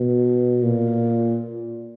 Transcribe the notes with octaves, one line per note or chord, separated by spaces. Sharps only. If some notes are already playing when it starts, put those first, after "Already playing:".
Already playing: B2
A#2